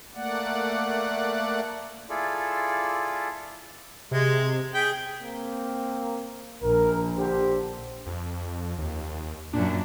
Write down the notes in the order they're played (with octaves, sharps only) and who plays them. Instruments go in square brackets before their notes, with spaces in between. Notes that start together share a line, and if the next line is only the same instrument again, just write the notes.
[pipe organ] A3 A#3 D5 F#5
[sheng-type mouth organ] E4 F4 G#4 A4 D5
[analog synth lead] C3 [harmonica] G#3
[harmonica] G#4 G5 [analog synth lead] B6
[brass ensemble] A#3 C4
[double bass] A#1 [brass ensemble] A#4
[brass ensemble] D3 G4 C5
[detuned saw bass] F2
D#2
[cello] F#2 A#2 [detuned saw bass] D4